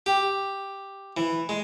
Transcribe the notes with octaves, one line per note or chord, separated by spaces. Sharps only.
G4
E3
G#3